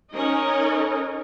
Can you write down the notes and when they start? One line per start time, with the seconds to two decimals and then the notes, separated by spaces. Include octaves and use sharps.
0.13 C#4 D#4 A#4 C#5 D#5